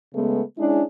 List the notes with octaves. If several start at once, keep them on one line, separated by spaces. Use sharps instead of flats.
C#3 G#3 A3 B3
G#3 C#4 D4 E4 G#4